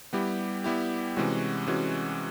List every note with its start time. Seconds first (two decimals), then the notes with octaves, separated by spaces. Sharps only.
0.13 G3 B3 E4 G4
0.64 G3 B3 E4 G4
1.16 C3 E3 G#3 C#4 F#4
1.67 C3 E3 G#3 C#4 F#4